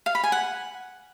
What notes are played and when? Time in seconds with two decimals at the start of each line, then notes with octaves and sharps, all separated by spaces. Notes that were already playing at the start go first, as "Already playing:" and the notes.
0.06 F5
0.15 B5
0.23 G#5
0.32 F#5